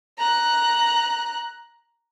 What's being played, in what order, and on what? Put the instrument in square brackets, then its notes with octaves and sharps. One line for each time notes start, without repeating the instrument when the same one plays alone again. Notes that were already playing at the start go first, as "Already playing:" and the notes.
[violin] A#5 F#6